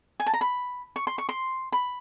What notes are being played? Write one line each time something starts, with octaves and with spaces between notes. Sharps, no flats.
G#5
A5
A#5
B5
C#6
C6
C#6
C6
B5